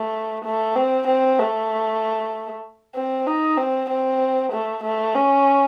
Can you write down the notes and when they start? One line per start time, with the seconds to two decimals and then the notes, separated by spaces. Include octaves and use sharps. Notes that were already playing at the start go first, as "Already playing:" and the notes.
Already playing: A3
0.44 A3
0.76 C4
1.07 C4
1.38 A3
2.95 C4
3.27 D#4
3.57 C4
3.90 C4
4.52 A3
4.83 A3
5.15 C#4